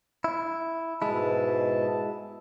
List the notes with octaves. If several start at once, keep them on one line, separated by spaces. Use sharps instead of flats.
E4
G#2 B2 G#3 E4 A5